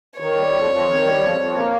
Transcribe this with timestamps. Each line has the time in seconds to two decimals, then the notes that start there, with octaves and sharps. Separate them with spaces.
0.20 D#3 C#5
0.37 G3
0.54 F2
0.70 F2
0.87 D#3
1.04 G3
1.21 F2
1.37 F2
1.55 A#3